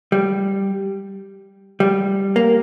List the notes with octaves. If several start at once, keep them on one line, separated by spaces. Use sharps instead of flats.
G3
G3
A#3